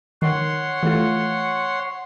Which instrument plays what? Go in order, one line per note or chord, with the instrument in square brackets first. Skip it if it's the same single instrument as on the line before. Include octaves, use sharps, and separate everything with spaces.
[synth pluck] D#3 [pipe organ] C#5 F#5 C6
[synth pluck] E3 A3 F4